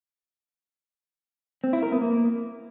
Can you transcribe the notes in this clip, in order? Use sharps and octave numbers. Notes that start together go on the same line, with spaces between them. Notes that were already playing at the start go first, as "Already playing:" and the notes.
C4
E4
A#4
B3
A#3